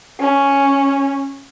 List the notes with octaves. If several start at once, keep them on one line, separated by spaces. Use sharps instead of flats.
C#4